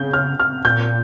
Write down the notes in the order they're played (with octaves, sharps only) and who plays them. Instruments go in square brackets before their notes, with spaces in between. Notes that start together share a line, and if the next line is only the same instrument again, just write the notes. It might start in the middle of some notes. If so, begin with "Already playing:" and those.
Already playing: [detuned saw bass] C#3 [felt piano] G6
[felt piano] F6
F6
[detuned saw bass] A#2 [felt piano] G6